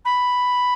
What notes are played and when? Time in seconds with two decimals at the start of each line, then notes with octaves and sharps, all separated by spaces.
0.04 B5